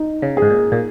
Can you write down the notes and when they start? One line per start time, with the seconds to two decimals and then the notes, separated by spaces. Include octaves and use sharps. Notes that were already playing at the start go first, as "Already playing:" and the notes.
Already playing: D#4
0.22 C#3
0.37 G#4
0.42 G#2
0.50 A#2
0.72 A#2